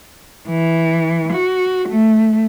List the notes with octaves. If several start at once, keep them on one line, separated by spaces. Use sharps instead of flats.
E3
F#4
A3